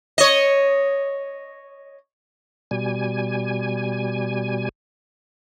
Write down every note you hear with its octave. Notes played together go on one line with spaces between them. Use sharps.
C#5 D#5
B2 G3 G#5